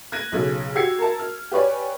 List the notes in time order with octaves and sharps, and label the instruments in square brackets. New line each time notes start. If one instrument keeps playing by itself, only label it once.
[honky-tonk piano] F#6 G#6 A#6 D#7
B1 C#3 A4
F#4 G4 E6 G#6 C7 C#7
A#4 A5
F6
G4 B4 C#5 D5 G#5